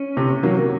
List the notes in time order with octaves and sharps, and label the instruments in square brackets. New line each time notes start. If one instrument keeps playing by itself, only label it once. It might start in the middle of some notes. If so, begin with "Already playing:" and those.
Already playing: [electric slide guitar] C#4
[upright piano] C3
D#3 F#3 A#3